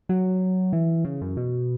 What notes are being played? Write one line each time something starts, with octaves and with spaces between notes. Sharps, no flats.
F#3
E3
C#3
F#2
B2